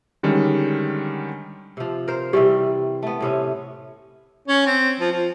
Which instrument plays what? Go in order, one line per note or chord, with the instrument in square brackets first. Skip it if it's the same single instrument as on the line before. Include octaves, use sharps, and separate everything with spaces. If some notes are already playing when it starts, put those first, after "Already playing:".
[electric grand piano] D3 D#3 G3 G#3 C#4
[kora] C3 F3
A#4 C5
[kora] C3 E3 G3 [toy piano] G4
[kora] A3 B3
A2 C3 C#4
[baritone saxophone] C#4
C4
F3
F3